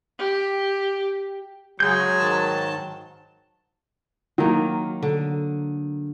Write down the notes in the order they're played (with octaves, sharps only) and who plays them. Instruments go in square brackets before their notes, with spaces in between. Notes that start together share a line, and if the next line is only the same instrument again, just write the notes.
[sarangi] G4
[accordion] C#3 [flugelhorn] F#3 [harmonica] G#3 [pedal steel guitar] G6
[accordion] G#2 D#3 A5
[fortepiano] D#3 [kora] F#3 A#3
[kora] D3